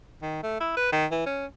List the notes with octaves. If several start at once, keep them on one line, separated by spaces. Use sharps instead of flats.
D#3
A3
E4
B4
D#3
E3
C#4